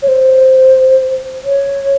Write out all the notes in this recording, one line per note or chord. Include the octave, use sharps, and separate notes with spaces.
C#5
C5
C#5